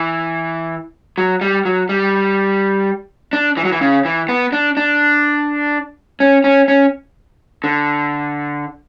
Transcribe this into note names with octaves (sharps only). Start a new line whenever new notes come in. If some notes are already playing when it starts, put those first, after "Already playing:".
Already playing: E3
F#3
G3
F#3
G3
D4
E3
F#3
E3
C#3
E3
B3
D4
D4
C#4
C#4
C#4
D3